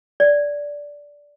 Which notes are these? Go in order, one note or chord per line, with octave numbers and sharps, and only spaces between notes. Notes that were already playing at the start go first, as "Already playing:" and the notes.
D5